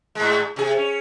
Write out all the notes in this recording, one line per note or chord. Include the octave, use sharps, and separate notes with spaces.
G#2 G#3
C3 G#4
C#4